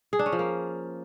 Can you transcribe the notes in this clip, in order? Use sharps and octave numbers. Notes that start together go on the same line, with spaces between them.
G#4
D4
C#4
F3
A#3